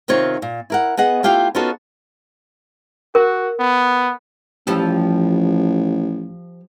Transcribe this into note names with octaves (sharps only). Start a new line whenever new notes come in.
C3 D#3 C4 F4 C#5
A#2
E4 A#4 F#5
B3 G#4 D#5 F#5
A3 E4 F4 G4 F5 G5
B3 C#4 D#4 F4 F#4 A4
F#4 A#4
B3
A1 F3 G3 A4